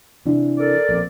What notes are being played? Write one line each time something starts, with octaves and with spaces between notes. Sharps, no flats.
C3 E3 D4
A4 A#4 D5
A#1 C4